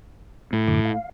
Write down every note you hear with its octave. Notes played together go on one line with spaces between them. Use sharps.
A2
F#2 D3 D6
F5